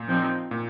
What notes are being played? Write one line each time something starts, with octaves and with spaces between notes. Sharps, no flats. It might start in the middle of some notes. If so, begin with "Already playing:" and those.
Already playing: A#2
F3 C4 D#4
A#2